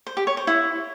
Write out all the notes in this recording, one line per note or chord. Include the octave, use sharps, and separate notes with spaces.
C5
G4
C#5
C5
E4